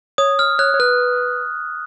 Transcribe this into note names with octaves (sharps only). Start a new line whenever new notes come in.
C#5 D#6
F6
C#5 F#6
C#5
B4 F#6